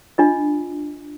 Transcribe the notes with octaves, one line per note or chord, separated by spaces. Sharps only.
D4 F4 D#5